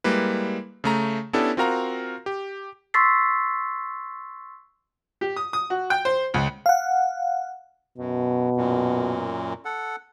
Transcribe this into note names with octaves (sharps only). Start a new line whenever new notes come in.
G3 G#3 A#3 E4 B4
C#3 A3 A#5
B3 C#4 D4 E4 G4 A4
C4 F4 F#4 A#4 F5 A#5
G4
C6 C#6 E6 A6 B6 C7
G4
D#6
D#6
F#4
G5
C5
C#2
F5 F#5
F#2 B2
F#2 A#2
A4 F#5